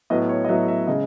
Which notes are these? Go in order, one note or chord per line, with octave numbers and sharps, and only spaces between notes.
A2 F#3 B3 D#5
C#5
D#5
A2 F#3 B3 E5
E5
C#3 G#3 D#5